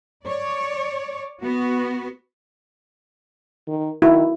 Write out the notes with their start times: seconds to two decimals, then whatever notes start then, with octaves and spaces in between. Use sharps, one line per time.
0.24 C#5 D5
1.40 B3 F#4
3.68 D#3
4.02 D#3 E4 F#4